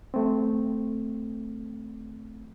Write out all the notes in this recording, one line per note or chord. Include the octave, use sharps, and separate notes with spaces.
A3 C4